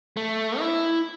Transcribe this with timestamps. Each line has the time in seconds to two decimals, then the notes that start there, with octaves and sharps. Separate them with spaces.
0.17 A3
0.60 E4